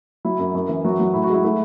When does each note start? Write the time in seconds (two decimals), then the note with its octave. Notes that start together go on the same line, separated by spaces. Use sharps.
0.25 F#3 E4
0.39 F#2
0.55 F#2
0.69 E3
0.85 F#3 F#4
0.99 F#3
1.14 A2 E4
1.24 F#4
1.30 G#3 E4
1.44 A3 E4